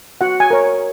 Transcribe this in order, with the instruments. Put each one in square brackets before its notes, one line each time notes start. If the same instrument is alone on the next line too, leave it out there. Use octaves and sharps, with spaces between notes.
[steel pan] F#4 F#5
G#5
A#4 C#5